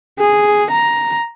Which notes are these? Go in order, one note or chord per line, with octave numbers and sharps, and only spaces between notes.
G#4
A#5